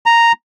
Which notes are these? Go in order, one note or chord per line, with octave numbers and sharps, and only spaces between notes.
A#5